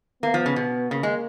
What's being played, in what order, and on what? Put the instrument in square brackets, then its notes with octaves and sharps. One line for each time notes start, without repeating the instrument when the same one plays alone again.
[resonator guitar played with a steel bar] A#3 [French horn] B3
[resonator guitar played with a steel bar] F3
C#3
B2
[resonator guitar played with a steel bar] C#3 [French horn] A#3
[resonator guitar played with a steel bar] G#3